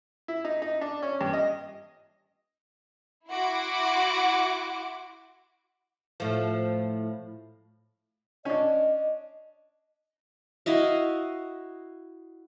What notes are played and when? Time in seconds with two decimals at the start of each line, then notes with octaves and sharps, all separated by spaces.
0.28 E4
0.45 D#4
0.62 D#4
0.81 D4
1.02 C#4
1.21 G2
1.33 D#5
3.29 E4 F#4 F#5 C6 D6
6.20 A2 F3
8.45 C#4 D4 D#5
10.66 E4 F#4 D#5 F5